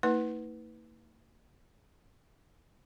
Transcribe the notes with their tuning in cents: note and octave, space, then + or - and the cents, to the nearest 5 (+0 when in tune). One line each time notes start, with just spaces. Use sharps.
A#3 -45 D#4 +45 B4 +0